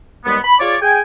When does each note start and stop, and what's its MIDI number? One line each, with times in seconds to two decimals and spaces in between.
0.25 0.36 39
0.25 0.36 55
0.25 0.36 56
0.25 0.36 59
0.43 0.55 83
0.59 0.76 65
0.59 0.76 68
0.59 0.76 73
0.59 0.76 74
0.82 1.00 68
0.82 1.00 79
0.82 1.00 80